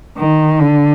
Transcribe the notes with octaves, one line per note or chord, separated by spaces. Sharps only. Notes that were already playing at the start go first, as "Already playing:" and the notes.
D#3
D3